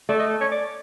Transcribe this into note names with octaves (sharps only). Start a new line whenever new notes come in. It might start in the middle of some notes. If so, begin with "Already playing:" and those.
A3 D5
D#5
C#5
D5